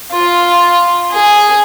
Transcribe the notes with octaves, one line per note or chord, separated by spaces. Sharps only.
F4
G#4